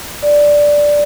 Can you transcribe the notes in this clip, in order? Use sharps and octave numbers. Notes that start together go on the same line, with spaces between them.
D5